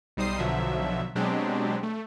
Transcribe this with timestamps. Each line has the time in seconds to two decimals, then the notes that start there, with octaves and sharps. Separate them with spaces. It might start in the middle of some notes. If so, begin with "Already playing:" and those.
0.17 B1 G3 D#4 C5 D#6 C7
0.38 B1 B2 D3 F3 F#3 E5
1.15 B2 F#3 G#3 C4 D4 G4
1.83 A3